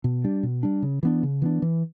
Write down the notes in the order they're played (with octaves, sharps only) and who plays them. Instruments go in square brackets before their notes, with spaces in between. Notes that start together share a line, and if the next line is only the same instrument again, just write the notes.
[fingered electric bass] B2
G3 D4
B2
G3 D4
C#3
E3 B3 D4
C#3
E3 B3 D4
E3